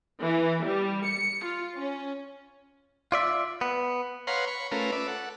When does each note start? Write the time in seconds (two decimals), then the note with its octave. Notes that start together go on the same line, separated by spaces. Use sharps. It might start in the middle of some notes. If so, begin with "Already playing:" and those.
0.21 E3
0.66 G3
1.06 C#7
1.45 F4
1.77 C#4
3.12 F4 D5 E5
3.61 B3
4.27 B4 C#5 F5 F#5 A#5 C6
4.48 B5 C#6
4.71 A3 C#4 F4 A#4 B4
4.92 B4 D5 E5
5.08 A4 F#5